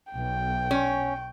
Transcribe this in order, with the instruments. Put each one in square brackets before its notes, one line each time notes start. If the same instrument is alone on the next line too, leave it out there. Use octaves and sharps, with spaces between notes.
[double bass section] B1 [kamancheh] G5
[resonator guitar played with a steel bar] C#4